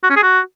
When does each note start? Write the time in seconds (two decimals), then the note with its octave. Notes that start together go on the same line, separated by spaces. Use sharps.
0.04 F#4
0.10 C#4
0.16 G#4
0.23 F#4